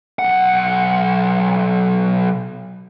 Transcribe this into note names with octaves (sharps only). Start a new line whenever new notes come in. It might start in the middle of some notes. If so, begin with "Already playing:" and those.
B1 F#5